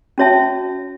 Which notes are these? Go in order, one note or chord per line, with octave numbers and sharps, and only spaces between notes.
C#4 F#4 C#5 E5 A5